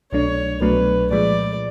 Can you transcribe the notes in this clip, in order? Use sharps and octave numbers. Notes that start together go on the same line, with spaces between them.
C2 B2 F#3 A3 D4 C#5
C2 B2 F#3 A3 D4 B4
A#2 F3 G#3 D5